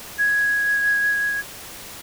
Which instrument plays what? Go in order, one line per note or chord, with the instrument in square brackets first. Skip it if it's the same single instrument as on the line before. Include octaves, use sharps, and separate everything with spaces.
[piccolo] G#6